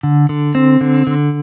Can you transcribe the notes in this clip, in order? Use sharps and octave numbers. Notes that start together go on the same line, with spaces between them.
D3
D3
C4
D3
D3